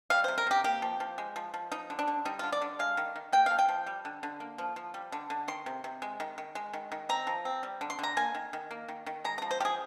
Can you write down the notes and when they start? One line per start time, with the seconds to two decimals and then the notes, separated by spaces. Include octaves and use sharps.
0.10 G3 F5
0.24 C3 C5
0.38 A#4
0.47 C3 G4
0.64 A#3 G4
0.82 F3
1.00 F3
1.18 G#3
1.36 F3
1.54 F3
1.72 F3 D#4
1.90 D3
1.99 D4
2.08 D3
2.25 G3 D#4
2.39 D3 F4
2.52 D5
2.62 D3
2.79 G#3 F5
2.97 D#3
3.16 D#3
3.33 A#3 G5
3.46 F3 F5
3.59 G5
3.69 F3
3.86 G3
4.05 D3
4.23 D3
4.40 A#3
4.58 F3
4.76 F3
4.94 G3
5.12 D3
5.30 D3
5.48 D#3 C6
5.66 C3
5.84 C3
6.02 G#3
6.20 D#3
6.38 D#3
6.55 G#3
6.73 D#3
6.92 D#3
7.09 C4 A#5
7.27 F3
7.45 C4
7.63 G3
7.81 D3
7.90 C6
7.99 D3 A#5
8.17 A#3 G#5
8.35 D#3
8.53 D#3
8.71 A#3
8.88 D#3
9.06 D#3
9.24 G#3 A#5
9.38 F3 A#5
9.51 C5
9.60 F3 G4
9.65 G#4